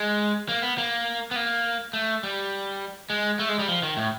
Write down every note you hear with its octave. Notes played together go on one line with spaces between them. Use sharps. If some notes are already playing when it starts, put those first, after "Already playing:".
Already playing: G#3
A#3
B3
A#3
B3
A#3
A3
G3
G#3
A3
G#3
G3
F3
D#3
A2